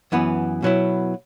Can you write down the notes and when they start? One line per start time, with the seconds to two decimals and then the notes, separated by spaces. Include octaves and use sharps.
0.12 F#2 E3 B3
0.62 B2 F#3 B3 E4